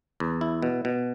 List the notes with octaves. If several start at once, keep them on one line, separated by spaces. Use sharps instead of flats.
E2
E4
B2
B2